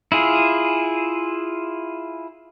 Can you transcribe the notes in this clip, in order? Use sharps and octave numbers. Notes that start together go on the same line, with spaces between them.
E4 F4 G#4